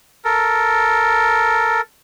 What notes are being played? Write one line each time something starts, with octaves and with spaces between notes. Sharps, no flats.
A4 A#4